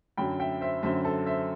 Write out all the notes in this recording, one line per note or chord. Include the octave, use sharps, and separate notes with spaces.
F#2 D3 F#3 G5 B5
E5 G5
C5 E5
F#2 D3 F#3 C5 E5
A4 C5
C5 E5